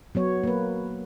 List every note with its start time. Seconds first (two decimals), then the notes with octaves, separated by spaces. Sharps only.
0.15 F#3 B3 C#5
0.44 A#3 B4